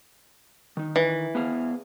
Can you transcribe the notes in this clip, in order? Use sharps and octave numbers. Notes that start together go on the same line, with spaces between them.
D#3 D#4
E3
B3 G#4 F5